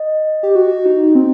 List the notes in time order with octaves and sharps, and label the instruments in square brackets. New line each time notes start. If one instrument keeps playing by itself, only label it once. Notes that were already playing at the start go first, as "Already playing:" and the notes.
Already playing: [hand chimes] D#5
[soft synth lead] G4
F#4
D#4
C4